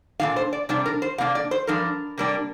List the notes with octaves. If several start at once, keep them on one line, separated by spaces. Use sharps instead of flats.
A#2 F3 D4 F5
C5
D5
C3 G3 D4 D5
A#4
C5
C3 A#3 D4 F5
D5
C5
G2 F3 D4 A#4
C3 G3 A#3 D4